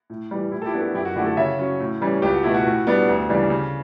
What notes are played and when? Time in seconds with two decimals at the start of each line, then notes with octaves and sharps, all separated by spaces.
0.10 A2
0.31 E3 G3
0.52 A2 E4
0.62 A4
0.66 E4 G4
0.73 F#3 B3 D4
0.80 F#4 A4
0.94 F#2 E4 G4
1.05 F#4
1.16 D3 E4 G4
1.19 A3
1.26 F#4 A4
1.37 C#3 C#5 E5
1.59 F#3 C#4
1.80 A2
2.01 E3 G3 C#4
2.22 C#2 G4
2.34 F#4
2.43 B2 A3 E4
2.54 F#4
2.65 A2
2.87 G3 B3 D4
3.09 D2
3.29 C#3 E3 G3 D4
3.50 C#3